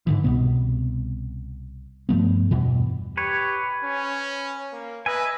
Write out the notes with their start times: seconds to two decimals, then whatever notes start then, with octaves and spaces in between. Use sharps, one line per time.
0.07 G#2 D3 E3
0.24 C2 B2 B3
2.09 G2 F3 A3 B3
2.51 E2 G2 B2 E3
3.17 G4 B4 C#5
3.84 C#4
4.73 A#3
5.06 B4 D#5 E5 G#5